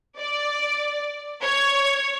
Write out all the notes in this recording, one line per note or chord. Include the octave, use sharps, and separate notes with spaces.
D5
C#5